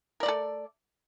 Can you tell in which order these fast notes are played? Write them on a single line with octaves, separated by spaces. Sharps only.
A#4 D5 A3 A4